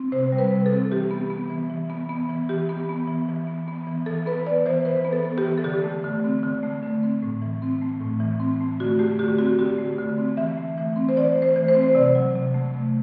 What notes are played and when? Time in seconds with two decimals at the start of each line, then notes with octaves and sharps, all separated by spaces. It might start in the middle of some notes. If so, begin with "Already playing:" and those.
Already playing: C4
0.12 C3 C5
0.32 G3
0.38 B4
0.52 C3
0.66 A4
0.72 C4
0.91 E3 G4
1.11 B3
1.30 B3
1.50 E3
1.70 E3
1.90 B3
2.09 B3
2.29 E3
2.49 E3 G4
2.69 B3
2.89 B3
3.08 E3
3.29 E3
3.47 B3
3.68 B3
3.87 E3
4.06 E3 A4
4.26 B3 B4
4.46 B3 D5
4.66 E3 C5
4.85 E3 B4
5.05 B3
5.13 A4
5.25 B3
5.38 G4
5.44 E3
5.58 A4
5.64 D3 G4
5.84 A3
6.04 D3
6.24 C4
6.43 D3
6.63 A3
6.83 D3
7.03 C4
7.23 A2
7.42 E3
7.62 C4
7.82 A3
8.01 A2
8.20 E3
8.40 C4
8.60 A3
8.80 D3 F#4
8.99 A3 G4
9.19 D3 G4
9.38 C4 F#4
9.59 D3 G4
9.78 A3
9.98 D3
10.18 C4
10.37 E3 E5
10.57 A3
10.77 E3
10.96 C4
11.09 C5
11.17 E3 D5
11.36 A3
11.42 C5
11.56 E3
11.68 C5
11.75 C4
11.83 C5
11.95 C3 D5
12.15 F#3
12.35 C3
12.54 A3
12.74 C3